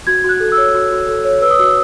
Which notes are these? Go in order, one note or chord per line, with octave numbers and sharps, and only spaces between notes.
F#4 G#6
F#4 F#6
A4
E6
C#5
F#4
F#4
A4
C#5
B4 E6
D#6
F#4 E6